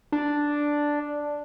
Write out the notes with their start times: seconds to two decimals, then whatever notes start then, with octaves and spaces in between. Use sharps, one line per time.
0.12 D4